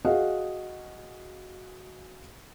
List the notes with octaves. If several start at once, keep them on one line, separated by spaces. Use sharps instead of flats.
F#4 G#4 D#5 F5 F#5